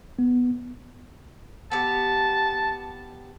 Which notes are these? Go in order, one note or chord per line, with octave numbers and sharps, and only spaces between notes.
B3
B3 G4 A5